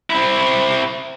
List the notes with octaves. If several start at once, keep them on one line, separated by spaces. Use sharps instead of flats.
C4 E4